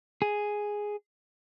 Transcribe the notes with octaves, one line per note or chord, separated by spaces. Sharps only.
G#4